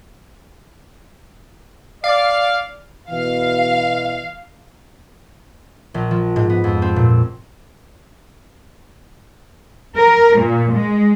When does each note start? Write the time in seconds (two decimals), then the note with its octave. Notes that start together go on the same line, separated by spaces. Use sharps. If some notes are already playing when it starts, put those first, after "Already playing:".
2.04 D5 F5
3.10 B2 E3 F5
5.94 A#1
6.11 F3
6.36 G#2
6.50 B3
6.64 F2
6.82 C4
6.96 A#2
9.97 A#4
10.38 A#2
10.73 G#3